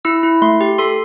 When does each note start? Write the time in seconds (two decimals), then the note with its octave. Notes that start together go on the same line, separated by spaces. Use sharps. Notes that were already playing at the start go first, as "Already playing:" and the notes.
0.05 E4 E6
0.23 E4
0.42 A3 C6
0.61 G4
0.78 A4 C6